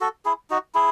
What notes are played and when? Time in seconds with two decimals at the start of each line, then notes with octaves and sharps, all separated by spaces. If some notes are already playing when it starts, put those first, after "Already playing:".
0.01 F#4 A4
0.25 E4 G#4
0.50 D#4 F#4
0.75 E4 G#4